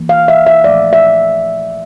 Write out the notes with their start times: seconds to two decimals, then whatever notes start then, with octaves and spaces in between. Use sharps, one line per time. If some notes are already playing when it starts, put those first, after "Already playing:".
Already playing: E3 A#3
0.09 F5
0.28 E5
0.47 E5
0.64 A#2 F3 A3 D5
0.93 E5